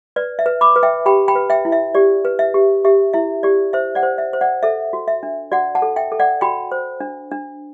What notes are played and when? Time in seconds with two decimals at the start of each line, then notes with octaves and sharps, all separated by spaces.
0.16 B4 D5
0.39 E5
0.46 B4
0.61 B5 D6
0.76 B4
0.83 E5 G5
1.06 G4 G5 B5
1.28 G5 B5
1.36 B4
1.50 E5 G5
1.65 E4
1.72 E5
1.95 G4 D5
2.25 B4
2.39 E5
2.54 G4
2.85 G4 E5
3.13 E4 E5
3.43 G4 D5
3.73 C5 E5
3.95 D5 F#5
4.03 C5
4.18 E5
4.33 C5
4.41 D5 F#5
4.63 A4 E5
4.93 F#4
5.08 E5
5.23 D4
5.52 F#4 D5 F#5
5.75 F#5 A5
5.82 A4
5.96 E5 G5
6.12 A4
6.20 D5 F#5
6.41 F#4 G5 B5
6.72 C5
7.00 D4
7.31 D4